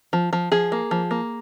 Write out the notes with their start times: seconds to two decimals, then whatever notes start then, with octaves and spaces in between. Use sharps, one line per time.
0.13 F3
0.33 F3
0.52 F3 G#4
0.72 A#3
0.91 F3
1.11 A#3